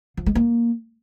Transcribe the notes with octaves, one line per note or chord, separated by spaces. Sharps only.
F3
G#3
A#3